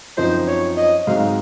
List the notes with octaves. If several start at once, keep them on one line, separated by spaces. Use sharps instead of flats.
F#2 F3 C4 D#4 C5
C#5
D#5
G#2 F#3 C4 D#4 F5